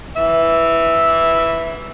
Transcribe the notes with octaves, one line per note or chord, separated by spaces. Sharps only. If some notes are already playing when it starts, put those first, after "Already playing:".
E3 E5